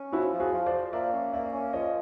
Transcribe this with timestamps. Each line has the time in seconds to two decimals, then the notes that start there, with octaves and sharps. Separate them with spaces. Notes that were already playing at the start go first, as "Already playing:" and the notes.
Already playing: C#4
0.12 F3 E4 F#4
0.33 F3
0.40 F#4 G#4
0.53 F3
0.66 C5 D5
0.73 F3
0.93 A#3 D5 E5
1.13 C#4
1.33 A#3 D5 E5
1.53 C#4
1.73 F3 C#5 D#5